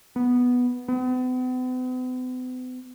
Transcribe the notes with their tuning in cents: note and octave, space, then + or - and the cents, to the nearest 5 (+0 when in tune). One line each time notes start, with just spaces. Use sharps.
B3 +0
B3 +45